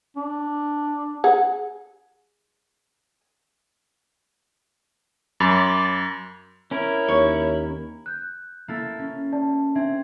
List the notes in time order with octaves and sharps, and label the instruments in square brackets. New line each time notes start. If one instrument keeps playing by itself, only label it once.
[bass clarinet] D4
[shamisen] G#4 F#5
[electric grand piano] F#2 [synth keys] B5 D6 A6
[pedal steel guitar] C#4 A#4 [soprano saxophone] E4
[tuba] D#2 [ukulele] C#5
[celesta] F#6 G6
[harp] A#3 E4 A4
C#4
[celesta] D5 A5
[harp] C4 [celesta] D4 E5 G#6